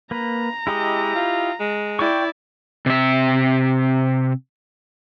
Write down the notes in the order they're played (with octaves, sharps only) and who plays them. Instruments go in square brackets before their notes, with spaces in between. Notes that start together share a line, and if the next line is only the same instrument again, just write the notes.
[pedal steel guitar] A#3 B4 [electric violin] A#5
[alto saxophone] G#3 [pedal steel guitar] E4 G4 D#5
[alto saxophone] F4
G#3
[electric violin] E4 D5 [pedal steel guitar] G5 C#6
[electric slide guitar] C3 E5